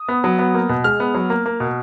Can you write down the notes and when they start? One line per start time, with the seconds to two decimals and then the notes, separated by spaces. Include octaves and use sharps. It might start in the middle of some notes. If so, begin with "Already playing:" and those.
Already playing: D#6
0.09 B3
0.24 F#3
0.39 B3
0.54 A#3
0.69 B2
0.84 G#3 F6
1.00 B3
1.15 F#3
1.30 A#3
1.46 A#3
1.60 B2